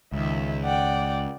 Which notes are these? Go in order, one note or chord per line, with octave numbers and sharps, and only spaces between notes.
C#2 D#3 E5
D5 F#5 G5